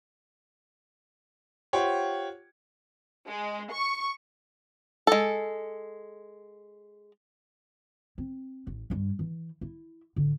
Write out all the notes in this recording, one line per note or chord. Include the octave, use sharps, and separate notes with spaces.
F4 G4 C5 C#5 F#5 G5
G#3
C#6
G#3 A4
C4
A1
G2 D4
E3
E4
A1 D3